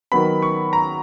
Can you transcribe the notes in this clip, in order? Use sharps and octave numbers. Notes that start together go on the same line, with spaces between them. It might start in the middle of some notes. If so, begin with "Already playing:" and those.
D#3 F#3 B3 B5
C#6
A#5